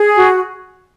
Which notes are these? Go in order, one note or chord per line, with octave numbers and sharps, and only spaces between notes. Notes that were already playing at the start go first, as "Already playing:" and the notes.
Already playing: G#4
F#4